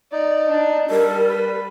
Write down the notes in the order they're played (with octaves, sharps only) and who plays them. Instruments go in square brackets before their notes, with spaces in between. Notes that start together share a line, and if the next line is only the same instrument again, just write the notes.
[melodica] D#4 [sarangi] D5
[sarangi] D4
[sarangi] G3 [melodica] A4 [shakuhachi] A#4
[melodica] B4